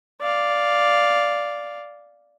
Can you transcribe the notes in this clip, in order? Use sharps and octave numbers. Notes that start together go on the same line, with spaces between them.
D5 F5